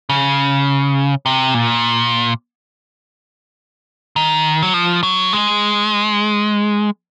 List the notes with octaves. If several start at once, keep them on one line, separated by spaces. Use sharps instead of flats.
C#3
C3
A#2
D#3
F#3
F3
F#3
G#3